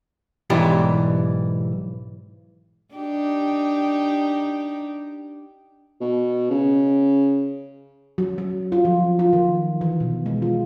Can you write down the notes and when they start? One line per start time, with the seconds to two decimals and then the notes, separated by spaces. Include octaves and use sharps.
0.50 B1 G#2 E3 G3 G4
2.94 D4 D#4 G4
6.01 B2
6.50 C#3
8.18 F#3
8.38 F#3
8.72 F4
8.85 F3
9.19 F4
9.33 D#3
9.81 E3
10.00 B2
10.26 G#3
10.42 F4